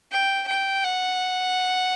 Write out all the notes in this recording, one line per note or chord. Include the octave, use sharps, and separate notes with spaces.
G5
G5
F#5